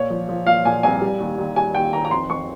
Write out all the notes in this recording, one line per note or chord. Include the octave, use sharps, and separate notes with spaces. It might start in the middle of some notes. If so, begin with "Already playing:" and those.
Already playing: A#2 C#5
F3
F3
A#2 F5
A#2 G#5
C2 G#5
G3
D#2
D#2
G3 G#5
D#2 G5
D#3 A#5
A#5
F2 C6
F2 C#6